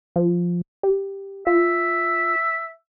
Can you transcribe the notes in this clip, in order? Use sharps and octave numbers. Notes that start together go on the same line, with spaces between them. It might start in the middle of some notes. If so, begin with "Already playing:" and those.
F3
G4
F4 E5